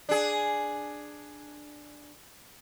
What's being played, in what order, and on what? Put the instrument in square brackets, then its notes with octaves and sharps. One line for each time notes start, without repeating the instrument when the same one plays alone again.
[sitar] D4 G#4